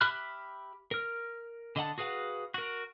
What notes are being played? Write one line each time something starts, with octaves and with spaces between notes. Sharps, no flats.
G4 E5 B5 F6 F#6
A#4 F6
D3 D#5 F#5 A5
F#4 G#4 B4 F5 F#5
F#4 A#4